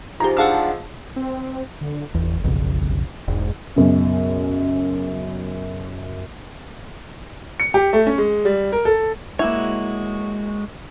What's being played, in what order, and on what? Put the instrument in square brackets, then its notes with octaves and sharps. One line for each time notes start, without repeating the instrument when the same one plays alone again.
[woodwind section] G#2 F3 [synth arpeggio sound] G4 A#5
[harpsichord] D4 F5 F#5 [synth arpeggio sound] G#4 A5 E6
[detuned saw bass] C4
D3
[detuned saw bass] G1 [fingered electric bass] E2
[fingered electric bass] B1 F2 C#3
[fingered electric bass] E1 [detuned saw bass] G#2
[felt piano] B1 F#2 C#3
[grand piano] C#7
G4
A3
C#4
G#3
G3
A#4
A4
[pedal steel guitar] G#3 F#4 C#5 [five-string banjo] A#3 E4